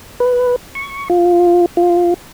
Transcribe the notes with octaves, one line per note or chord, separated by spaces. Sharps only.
B4
C#6
F4
F4